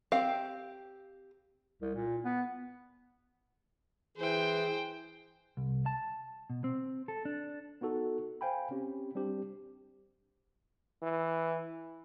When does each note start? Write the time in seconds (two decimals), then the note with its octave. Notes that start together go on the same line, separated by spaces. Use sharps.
0.12 C4 G4 F5
1.82 C2
1.95 A#2
2.25 B3
4.17 E3 G#4 C5 G5
5.57 C2
5.86 A5
6.50 B2
6.64 C4
7.08 A4
7.25 D4
7.81 B3 D#4 F#4 A4
8.41 C5 F5 G5 G#5 B5
8.71 C4 C#4 G4
9.15 G3 C4 D4 G4
11.03 E3